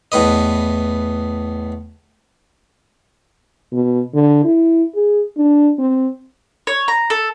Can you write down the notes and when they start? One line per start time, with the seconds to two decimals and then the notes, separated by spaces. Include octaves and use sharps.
0.12 E2 A2 B4 D#5
3.73 B2
4.14 D3
4.44 E4
4.95 G#4
5.37 D4
5.79 C4
6.67 C#5
6.88 A#5
7.10 A4